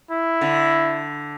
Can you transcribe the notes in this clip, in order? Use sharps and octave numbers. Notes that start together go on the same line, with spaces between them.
E4
D3